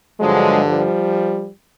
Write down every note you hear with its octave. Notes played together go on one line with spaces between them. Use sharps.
G2 D3 F3 F#3 G#3
F3 G3